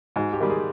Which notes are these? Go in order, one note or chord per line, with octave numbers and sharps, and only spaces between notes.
G#2 F#4
G4
D#3 G3
G#4